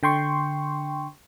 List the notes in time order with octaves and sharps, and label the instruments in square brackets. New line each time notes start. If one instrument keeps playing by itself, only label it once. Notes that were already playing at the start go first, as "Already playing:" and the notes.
[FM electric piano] D3 G5 C6 C#6